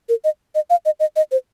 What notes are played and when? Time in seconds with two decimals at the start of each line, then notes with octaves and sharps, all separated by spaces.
0.09 A#4
0.24 D#5
0.55 D#5
0.70 F5
0.86 D#5
1.00 D#5
1.16 D#5
1.32 C5